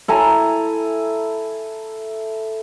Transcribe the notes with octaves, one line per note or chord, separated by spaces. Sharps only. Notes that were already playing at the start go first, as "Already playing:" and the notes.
E4 A4 G#5 A#5